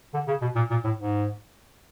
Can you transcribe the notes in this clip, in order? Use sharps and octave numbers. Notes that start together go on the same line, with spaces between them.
D3
C#3
B2
A#2
A#2
A2
G#2